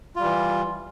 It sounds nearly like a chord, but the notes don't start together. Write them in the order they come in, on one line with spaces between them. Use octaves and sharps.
F4 G3 E3